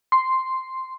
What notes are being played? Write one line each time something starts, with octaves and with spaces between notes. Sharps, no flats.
C6